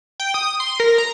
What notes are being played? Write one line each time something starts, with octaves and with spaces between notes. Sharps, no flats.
G5
D#6
C6
A#4
A#5